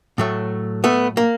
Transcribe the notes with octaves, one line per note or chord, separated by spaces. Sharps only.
A2 F#3 A3
A3 B3
A#3